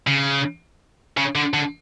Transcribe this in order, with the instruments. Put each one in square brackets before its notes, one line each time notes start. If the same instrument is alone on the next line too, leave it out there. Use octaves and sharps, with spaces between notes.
[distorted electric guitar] C#3
C#3
D3
D3